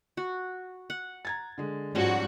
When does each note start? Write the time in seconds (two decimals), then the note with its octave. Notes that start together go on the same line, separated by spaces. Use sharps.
0.17 F#4
0.90 F#5
1.25 A#5 G#6 A6
1.58 D3 G#3
1.95 G#2 F3 G3 C#4 F#4 C5